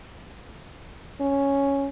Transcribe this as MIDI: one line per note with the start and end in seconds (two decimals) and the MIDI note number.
1.21 1.89 61